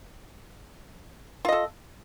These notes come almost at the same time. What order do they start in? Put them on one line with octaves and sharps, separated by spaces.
F4 D#5 A4